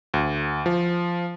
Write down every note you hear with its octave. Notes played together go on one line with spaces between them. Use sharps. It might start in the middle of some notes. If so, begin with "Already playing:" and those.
D2
F3